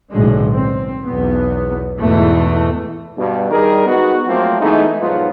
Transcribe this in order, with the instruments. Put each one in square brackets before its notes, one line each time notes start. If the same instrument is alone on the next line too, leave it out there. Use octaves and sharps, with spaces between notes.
[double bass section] F#1 B1 A2 D3 G#3
C4
B1 E2 B3
E2 G#2 B2 E3 A3
[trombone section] G2 B2
G2 D#3 G3 G#4 A#4
G#3 B3 D#4 F#4
F3 F#3 A3 A#3 C4 F4
E3 G#3 A3 B3 D#4
B1 G#2 F3 F#3 B3 F4